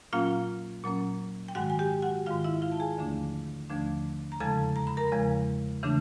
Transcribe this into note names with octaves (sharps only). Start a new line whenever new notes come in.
A#2 F#3 A#3 C#4 F4 F5
A#2 F#3 A#3 C#4
G5
G#2 D#3 G#3 F#4 F#5
G#5
G4 G5
F#4 F#5
G#2 D#3 G#3 F4 F5
E4 E5
F4 F5
A5
G#4 G#5
D#2 D3 F3 A3 D4
D#2 D3 F3 A3 D4
A#5
E2 C#3 F3 G#3 A4 A5
A#5
B5
A#4 A#5
E2 C#3 F3 G#3
C#3 E3 A3 D4